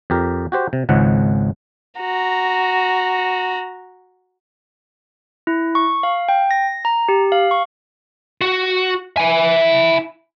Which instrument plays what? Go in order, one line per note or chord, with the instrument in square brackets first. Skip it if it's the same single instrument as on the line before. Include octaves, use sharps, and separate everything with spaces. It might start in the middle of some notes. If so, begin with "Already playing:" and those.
[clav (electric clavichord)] F2 G4 A#4
F#4 G4 C5
C3
G#1 C#2 G#2 C#3 F#5
[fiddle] F#4 A#5
[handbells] E4
C#6
F5
G5
A#6
A#5
G4
F5
C#6
[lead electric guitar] F#4
E4 G#5